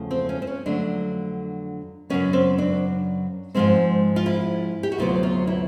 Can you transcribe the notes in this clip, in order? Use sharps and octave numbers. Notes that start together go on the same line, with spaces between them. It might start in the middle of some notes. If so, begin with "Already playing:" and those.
Already playing: E2 C#3 F3 A3
C4
C#4
C4
C#4
F2 D3 F#3 A3 D4
F#2 C#3 F#3 B3 C#4
C4
D4
G#2 F3 G#3 C4
F4
E4
G4
F#4
D2 C3 D#3 F#3 B3 F4
F4
E4